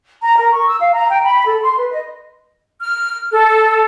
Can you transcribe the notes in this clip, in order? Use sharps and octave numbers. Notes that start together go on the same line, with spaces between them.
A#5
A#4
C#6
E6
F5
A#5
G5
B5
A4
C6
B4
D#5
F6
A4